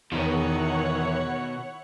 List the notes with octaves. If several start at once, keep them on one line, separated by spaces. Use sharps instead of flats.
E2 B2 D#3 E4 C#5 F#5